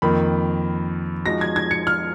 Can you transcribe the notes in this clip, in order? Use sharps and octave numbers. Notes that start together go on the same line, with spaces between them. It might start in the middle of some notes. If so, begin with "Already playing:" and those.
F2 D#3 A#3 B5
F3 G#3 D#4 F#4 A#6
G#6
G#6
C#7
F6